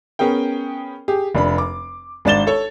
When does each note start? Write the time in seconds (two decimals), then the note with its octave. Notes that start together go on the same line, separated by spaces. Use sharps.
0.19 B3 C#4 G#4 A#4 G5
1.08 G4 G#4
1.35 F1 D4 B5
1.58 D6
2.25 G#1 D4 D5 A6 E7 G7
2.47 A4 C#5